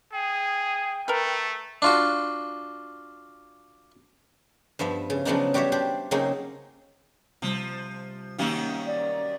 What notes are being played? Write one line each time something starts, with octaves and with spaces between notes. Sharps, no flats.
G#4 G5
A3 A#4 B4
D4 F4 F#4
G2 F3 B3 E5
C#3
C#3 F3 F#3 B3 D4 D#4
G3 F#4 G4 C#5 E5
D4 G4 C5
C#3 F#3 A#3 C4 D#4 G#4
C3 F3 G3 C4
F#2 D#3 A#3 C#4 G4 F5
D5